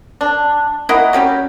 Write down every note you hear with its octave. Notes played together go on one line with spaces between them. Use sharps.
D4
A#3 E4 D#5 F#5
F#3 G3 C#4 G4